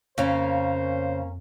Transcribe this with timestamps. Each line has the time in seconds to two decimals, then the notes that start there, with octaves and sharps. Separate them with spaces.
0.18 F2 C#3 A#3 C#4 C5